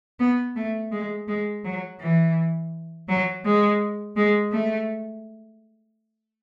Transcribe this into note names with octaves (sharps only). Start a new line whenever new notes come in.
B3
A3
G#3
G#3
F#3
E3
F#3
G#3
G#3
A3